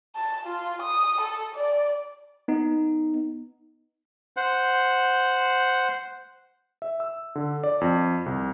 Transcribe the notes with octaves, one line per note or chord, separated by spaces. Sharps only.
A5
F4
D#6
A4
D5
B3 D#4
C5 F#5
E5
E6
D3
D5
F2
C2